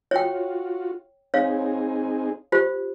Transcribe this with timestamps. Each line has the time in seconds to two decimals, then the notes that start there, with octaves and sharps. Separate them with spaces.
0.11 F4 F#4 C#5 G5
1.34 C4 D#4 G#4 C#5 F5
2.52 F4 G4 C5